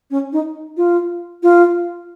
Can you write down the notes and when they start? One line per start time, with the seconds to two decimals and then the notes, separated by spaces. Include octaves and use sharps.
0.11 C#4
0.33 D#4
0.77 F4
1.43 F4